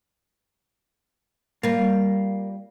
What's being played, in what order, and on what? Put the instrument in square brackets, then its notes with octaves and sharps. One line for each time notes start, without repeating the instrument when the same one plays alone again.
[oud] G3 F4 [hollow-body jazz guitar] A#3